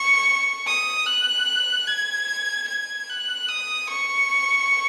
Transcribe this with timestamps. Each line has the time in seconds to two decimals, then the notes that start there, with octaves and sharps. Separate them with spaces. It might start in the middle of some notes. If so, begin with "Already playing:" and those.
Already playing: C#6
0.67 D#6
1.06 F#6
1.87 G#6
2.68 G#6
3.09 F#6
3.49 D#6
3.89 C#6